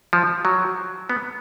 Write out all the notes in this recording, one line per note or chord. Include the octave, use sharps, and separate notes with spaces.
F3
F#3
B3